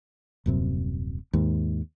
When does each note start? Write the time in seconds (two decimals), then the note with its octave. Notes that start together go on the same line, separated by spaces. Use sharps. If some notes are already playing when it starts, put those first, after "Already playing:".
0.46 D#1 F#2 C3
1.33 D#2 G#2